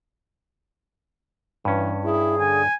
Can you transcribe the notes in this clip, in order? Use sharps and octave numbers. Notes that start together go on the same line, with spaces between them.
G2 E3 C#4
E4 G#4
D3 G#5